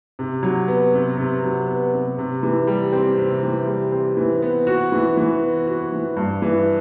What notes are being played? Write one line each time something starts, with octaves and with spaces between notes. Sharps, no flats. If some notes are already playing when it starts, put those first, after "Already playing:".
C3
F#3
B3
C3
C3
F#3
B3
C3
C3
E3
G3
C4
C3
E3
G3
C4
E3
B3
F#4
E3
E3
B3
F#4
E3
G2
E3